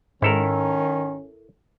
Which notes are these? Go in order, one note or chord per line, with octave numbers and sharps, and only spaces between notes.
G#2 D#3 C#4 E4 A4 A#4